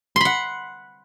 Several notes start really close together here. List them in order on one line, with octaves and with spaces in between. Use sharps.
C6 B5 F#5